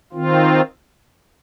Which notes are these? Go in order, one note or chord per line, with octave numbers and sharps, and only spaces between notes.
D#3 C4 F4